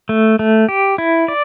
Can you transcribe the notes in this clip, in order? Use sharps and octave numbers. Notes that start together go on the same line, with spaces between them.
A3
A3
G4
E4
D5